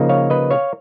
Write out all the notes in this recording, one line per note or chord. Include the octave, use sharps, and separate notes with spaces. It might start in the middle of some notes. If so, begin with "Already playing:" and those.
Already playing: C#3 F3 A#3 D#4
C#5 F5
B4 D#5
C#5 F5